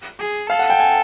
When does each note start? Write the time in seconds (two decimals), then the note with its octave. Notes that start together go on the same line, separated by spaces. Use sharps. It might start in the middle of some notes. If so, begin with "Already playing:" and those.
0.19 G#4
0.50 A4 F5
0.59 F#5
0.70 G5
0.80 G#5